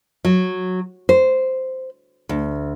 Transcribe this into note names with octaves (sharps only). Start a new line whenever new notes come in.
F#3
C5
D2